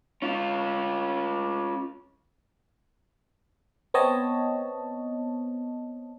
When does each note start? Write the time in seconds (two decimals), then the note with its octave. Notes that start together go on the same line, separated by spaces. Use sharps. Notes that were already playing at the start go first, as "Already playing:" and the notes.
0.22 C#4 F4
3.94 B3 C4 C#5 D#5 A5